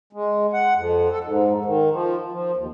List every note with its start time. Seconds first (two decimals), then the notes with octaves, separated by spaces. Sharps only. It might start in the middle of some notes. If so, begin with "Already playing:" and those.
0.13 G#3
0.53 F#5
0.75 F2
1.10 A4
1.24 G#2
1.65 D#3
1.91 F3
2.32 F3
2.56 D#2